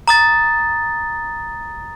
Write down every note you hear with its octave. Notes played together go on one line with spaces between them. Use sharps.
A#5 D#6 A6